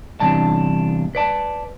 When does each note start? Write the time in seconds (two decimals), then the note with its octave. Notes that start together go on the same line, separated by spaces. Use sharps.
0.20 E2 G2 C3 D4 A5
1.15 B4 D5 A5